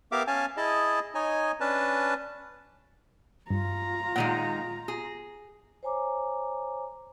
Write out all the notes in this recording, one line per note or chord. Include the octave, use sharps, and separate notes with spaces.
B3 G4 A#4 E5 F5 D6
C#4 F5 G#5 A5
E4 G#4 D#5 A5
D#4 C#5 D#5 G#5
C#4 D4 B4 A5
G2 F4 A#5
A#2 D#3 G#3 F#5 D#7
G#4
C5 C#5 G#5 A#5 D6